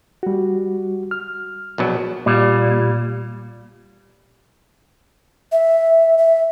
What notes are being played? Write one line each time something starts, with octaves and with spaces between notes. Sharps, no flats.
G3 F#4
F6
A#1 B2 F#3
A#2 G3
E5
E5